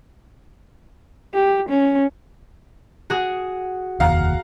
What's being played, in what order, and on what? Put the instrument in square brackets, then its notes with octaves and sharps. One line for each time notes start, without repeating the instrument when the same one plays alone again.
[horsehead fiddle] G4
C#4
[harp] F#4 G#4
[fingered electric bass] F1 D#2 [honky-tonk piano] F5 F#5 A#5